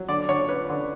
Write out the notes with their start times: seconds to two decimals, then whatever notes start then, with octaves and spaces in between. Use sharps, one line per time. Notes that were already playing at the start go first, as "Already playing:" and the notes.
Already playing: F#3
0.09 D3 D5
0.29 D3 C#5
0.49 C#4 B4
0.70 D3